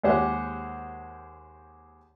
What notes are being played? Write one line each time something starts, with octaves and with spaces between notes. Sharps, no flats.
D#2 G#3 G4 C5 C#5 F#5